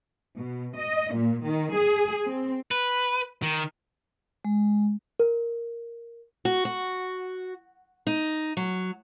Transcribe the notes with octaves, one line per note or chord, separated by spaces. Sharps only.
B2
D#5
A#2
D#3
G#4
C4
B4
D#3
G#3
A#4
F#4
F#4
D#4
F#3